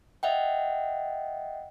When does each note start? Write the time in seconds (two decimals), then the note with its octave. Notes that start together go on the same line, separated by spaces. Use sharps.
0.23 D#5 E5 F#5 G5